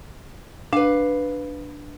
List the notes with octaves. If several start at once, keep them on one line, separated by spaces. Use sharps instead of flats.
D4 B4 F5